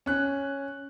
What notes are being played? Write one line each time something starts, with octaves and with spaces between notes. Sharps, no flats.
C#4 F#6